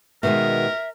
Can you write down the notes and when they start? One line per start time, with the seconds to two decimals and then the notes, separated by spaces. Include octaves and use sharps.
0.23 B2 D#3 G#3 A#4 E5